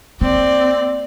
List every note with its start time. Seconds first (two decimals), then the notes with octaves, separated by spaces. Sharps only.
0.21 A#3 C4 D5